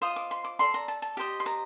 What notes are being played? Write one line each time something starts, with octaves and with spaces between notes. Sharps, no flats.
F4 C5 D#5 D#6
D6
C6
D6
A4 D5 C6
A#5
A5
A5
G4 C5 D#5
C6
A#5